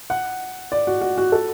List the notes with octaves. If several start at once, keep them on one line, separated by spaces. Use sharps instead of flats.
F#5
D5
F#4
F#4
F#4
A4